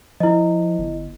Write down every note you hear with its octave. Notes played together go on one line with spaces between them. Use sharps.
F3 E4 D#5
G1